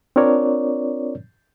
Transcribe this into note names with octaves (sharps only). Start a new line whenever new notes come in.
C4 D4 F4 A#4 C#5 D5